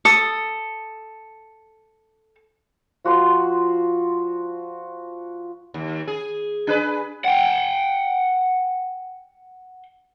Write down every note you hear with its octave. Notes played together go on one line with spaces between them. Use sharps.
A4 D#6
F3 F#4 D5 C6
D#2
G#4
D4 G#4 B4
F#5 G5